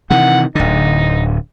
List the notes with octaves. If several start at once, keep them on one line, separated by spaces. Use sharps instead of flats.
C3 D#3 E3 F#5
D1 D3 D#4